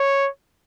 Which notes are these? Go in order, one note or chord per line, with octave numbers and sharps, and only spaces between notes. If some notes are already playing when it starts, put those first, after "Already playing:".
Already playing: C#5